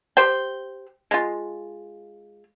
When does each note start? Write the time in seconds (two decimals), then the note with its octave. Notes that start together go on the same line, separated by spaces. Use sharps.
0.17 G4 C5 G5
1.11 G#3 F4